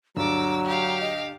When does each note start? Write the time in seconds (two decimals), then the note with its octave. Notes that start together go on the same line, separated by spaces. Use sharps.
0.17 D2 G2 F#3 A#5 D6 E6
0.65 G4 F5
1.00 D#5